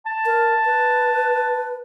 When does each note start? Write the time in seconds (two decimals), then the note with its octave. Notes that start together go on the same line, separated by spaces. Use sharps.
0.06 A5
0.26 A#4
0.66 B4